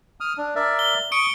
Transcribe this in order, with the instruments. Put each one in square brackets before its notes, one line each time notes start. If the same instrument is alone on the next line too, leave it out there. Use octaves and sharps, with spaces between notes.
[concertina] D#6 F6
D4
A#4 D5 E5
[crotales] G7
[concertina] C#6 D#6 [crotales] C#7 D7